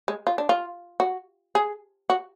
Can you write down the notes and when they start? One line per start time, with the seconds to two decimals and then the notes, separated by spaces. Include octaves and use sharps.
0.08 G#3
0.27 F4
0.38 D4
0.49 F4
1.00 F#4
1.55 G#4
2.10 F#4